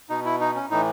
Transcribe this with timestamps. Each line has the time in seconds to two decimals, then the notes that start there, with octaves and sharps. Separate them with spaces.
0.09 B2 D#4
0.25 E4
0.40 D#4
0.55 C#4
0.70 A2 E3 D#4